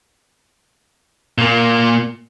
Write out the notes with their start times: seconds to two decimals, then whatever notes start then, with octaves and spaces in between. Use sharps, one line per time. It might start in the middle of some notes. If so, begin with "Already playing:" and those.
1.38 A#2 A#3